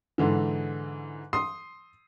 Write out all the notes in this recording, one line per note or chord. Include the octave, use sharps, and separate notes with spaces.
G#2 D3 E3
C6 D#6 C7